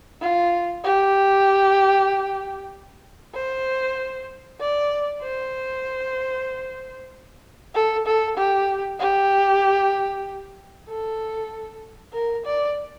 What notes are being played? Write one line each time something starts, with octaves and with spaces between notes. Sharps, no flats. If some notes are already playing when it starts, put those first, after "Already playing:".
F4
G4
C5
D5
C5
A4
A4
G4
G4
A4
A#4
D5